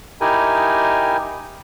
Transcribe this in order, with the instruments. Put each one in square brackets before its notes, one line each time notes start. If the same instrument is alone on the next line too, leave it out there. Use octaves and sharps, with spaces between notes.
[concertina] D#4 E4 G4 A#4 G#5